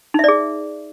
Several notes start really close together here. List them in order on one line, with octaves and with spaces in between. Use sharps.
D#4 E5 D5 G#4